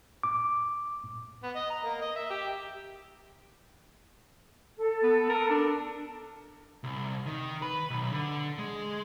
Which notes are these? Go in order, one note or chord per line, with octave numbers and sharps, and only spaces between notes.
D6
B3
D#5
A#5
A#3
D#5
E5
G4
A4
B3
A#4
D4
C2
D#3
B4
B1
D3
G#3